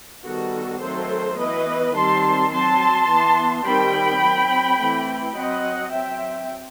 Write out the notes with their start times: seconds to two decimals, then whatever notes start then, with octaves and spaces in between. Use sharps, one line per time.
0.24 D#3 G3 B3 F#4 A4
0.82 D#3 F#3 A3 C4 A4 C5
1.38 E3 B3 B4 D#5
1.94 D#3 G3 C4 A5 C6
2.52 F#3 C4 A5 C6
3.08 E3 B3
3.65 D#3 G3 C4 G5 B5
4.22 F#3 C4
4.79 E3 A3 C4
5.36 F#3 C4 D#5 F#5
5.92 F#3 C4 E5 G5